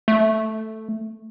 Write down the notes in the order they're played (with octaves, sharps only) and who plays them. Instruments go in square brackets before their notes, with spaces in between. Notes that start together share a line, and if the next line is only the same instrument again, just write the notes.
[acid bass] A3